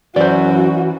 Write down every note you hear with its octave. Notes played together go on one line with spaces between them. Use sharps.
F#2 E3 F#4 C5 D5